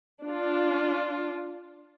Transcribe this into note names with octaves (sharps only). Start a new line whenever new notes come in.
D4 F4